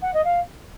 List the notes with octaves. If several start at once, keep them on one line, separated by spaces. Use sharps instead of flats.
F#5
D#5
F5